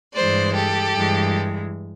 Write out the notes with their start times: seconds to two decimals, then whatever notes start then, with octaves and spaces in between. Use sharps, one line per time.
0.14 G2 E3 G#3 C5 D5
0.53 G4 A4
0.93 G2 E3 G#3